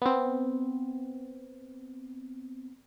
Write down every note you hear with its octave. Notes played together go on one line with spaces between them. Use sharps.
B3 C4